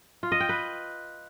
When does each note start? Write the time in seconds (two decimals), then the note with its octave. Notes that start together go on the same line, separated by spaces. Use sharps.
0.23 F4
0.32 D#5
0.40 G5
0.49 B4